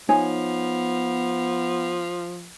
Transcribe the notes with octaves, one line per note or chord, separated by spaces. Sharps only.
F3 B3 D#4 C#5 G#5